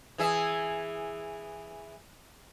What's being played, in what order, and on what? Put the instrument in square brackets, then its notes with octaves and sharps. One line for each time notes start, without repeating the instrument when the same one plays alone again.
[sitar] E3 G#4 E5